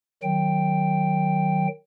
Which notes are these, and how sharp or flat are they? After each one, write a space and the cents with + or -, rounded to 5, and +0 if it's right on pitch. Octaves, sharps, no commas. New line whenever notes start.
D#3 -15 F#3 +0 G5 +0